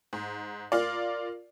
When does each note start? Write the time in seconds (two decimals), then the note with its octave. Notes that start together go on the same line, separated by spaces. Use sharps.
0.13 G#2
0.72 F4 A#4 D5